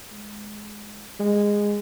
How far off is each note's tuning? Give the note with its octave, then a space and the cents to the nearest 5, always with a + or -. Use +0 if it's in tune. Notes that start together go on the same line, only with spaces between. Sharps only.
G#3 +10
G#3 -15